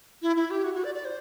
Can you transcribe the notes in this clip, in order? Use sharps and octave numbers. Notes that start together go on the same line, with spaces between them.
E4
E4
G4
F#4
F#4
D5
D5
C5